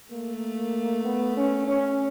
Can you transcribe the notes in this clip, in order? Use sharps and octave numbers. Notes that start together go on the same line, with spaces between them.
A3 A#3
B3
C#4
C#4